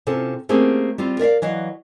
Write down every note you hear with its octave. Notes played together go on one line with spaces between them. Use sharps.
C3 C#4 F4 A4
A3 A#3 C4 C#4 G4 G#4
G3 C4 F4
A#4 D5 E5 F5
E3 F#3 D#5 F5